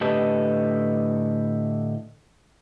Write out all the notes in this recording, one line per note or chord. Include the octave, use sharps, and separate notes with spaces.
A2 D3 G4 A4 B4 D#5